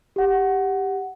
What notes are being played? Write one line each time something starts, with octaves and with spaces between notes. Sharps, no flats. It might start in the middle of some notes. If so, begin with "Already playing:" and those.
G4 F#5